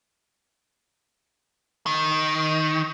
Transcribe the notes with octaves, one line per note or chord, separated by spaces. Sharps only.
D#3